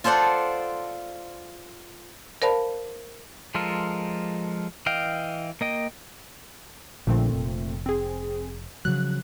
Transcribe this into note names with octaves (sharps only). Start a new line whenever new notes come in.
F4 A4 C5 D5 F#5
A#4 C5 D5 F5 A5 B5
F3 G#3 F4 A4 A#4
E3 D#5 F5 G5
A#3 D#5 G5
A#1 A#2 D3 F3 A3 C4
F1
C4 G#4
C#3 F3 F#3 F#6